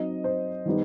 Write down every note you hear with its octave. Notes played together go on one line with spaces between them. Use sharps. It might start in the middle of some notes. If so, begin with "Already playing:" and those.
Already playing: F#3 C4 D#4 D#5
C5
D#3 G3 B3 D#4